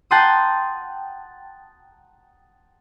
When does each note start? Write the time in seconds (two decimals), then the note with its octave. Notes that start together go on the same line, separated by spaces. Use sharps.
0.11 F#5 G5 A5 A#5 C6 D#6